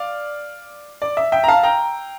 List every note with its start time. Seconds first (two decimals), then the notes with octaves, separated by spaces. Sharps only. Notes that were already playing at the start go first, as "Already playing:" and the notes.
Already playing: D5 F5
1.02 D5
1.17 E5
1.32 E5 G5
1.44 A#5
1.48 F5 A5
1.63 G5 A#5